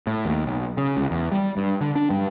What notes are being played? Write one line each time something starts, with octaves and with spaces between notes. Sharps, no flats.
A2
D#2
B1
C#3
C#2
E2
G3
G2
D3
D4
G2